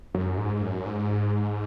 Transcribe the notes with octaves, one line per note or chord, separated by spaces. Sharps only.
F#2
G#2
F#2
G#2